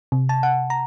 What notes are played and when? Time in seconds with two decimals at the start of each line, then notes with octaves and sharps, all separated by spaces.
0.12 C3
0.29 A5
0.43 F#5
0.70 A#5